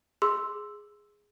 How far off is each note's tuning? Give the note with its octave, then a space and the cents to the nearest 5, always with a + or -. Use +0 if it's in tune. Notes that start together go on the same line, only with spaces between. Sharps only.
G#4 +0 C6 +0 E6 +0